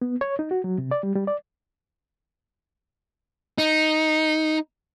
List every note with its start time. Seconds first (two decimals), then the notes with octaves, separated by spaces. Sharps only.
0.02 B3
0.21 C#5
0.39 D#4
0.51 F#4
0.64 F#3
0.78 C3
0.91 D5
1.03 G3
1.15 G3
1.27 D5
3.58 D#4